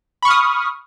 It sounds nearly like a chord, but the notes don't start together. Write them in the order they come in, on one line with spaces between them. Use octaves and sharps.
B5 C#6 F6 D#6